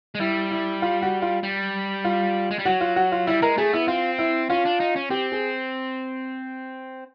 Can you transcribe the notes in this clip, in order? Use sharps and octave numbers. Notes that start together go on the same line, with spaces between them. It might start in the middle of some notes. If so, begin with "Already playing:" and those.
G#3
G3 E4
E4
F4
F#4
F4
G3
F4
G#3
G3
F#3 F#4
F4
F#4
F4
G3 E4
G#3 A#4
A3 G#4
B3 E4
C4 F4
E4
C#4 F4
D4
D#4
C#4
C4 G4
G#4